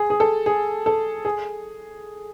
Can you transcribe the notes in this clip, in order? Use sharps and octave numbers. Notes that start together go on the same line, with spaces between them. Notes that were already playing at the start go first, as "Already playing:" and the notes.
Already playing: G#4
G#4
A4
G#4
A4
G#4